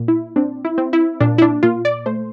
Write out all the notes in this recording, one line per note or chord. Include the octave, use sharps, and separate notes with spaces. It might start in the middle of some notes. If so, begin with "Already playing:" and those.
Already playing: A#2
E4
C4 D4
E4
C4
E4
A#2 D4
E4
D4
A#2 F4
D5
A3 C5